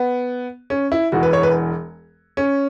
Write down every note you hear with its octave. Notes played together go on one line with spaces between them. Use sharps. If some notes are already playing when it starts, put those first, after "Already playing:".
Already playing: B3
C#4
E4
E1 E2 E3 F#4
B4
C#5
B4
C#4